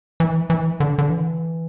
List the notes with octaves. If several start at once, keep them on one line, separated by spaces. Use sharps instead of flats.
E3
E3
D3
D3
E3